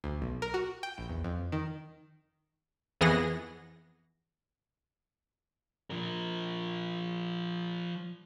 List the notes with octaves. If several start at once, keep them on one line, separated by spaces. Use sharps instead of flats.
D2
B1
A#4
F#4
G5
A#1
E2
F2
D#3
F2 E3 B3 G#4 F#5 A#6
F3 A#4